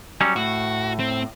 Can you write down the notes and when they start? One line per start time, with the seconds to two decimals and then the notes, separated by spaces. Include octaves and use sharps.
0.21 F#3 G3 C#4
0.36 A2 F#4
0.99 C4